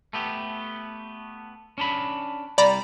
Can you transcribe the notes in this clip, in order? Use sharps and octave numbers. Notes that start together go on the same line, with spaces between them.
A3 B3 G4
C#4 D4 B5
C2 G3 D5 A#5 B5